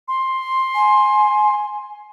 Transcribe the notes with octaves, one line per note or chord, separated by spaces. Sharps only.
C6
G#5